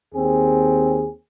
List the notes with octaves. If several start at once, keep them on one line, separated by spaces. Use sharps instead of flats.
D#2 C4 G#4